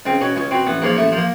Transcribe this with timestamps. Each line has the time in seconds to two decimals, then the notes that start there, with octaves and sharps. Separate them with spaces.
0.06 C#2 C4
0.21 B2 C#4
0.36 C#2 C#4
0.51 B2 C4
0.67 A1 B3
0.82 G#2 F3 A#3
0.97 A1 A3
1.12 F3 A#3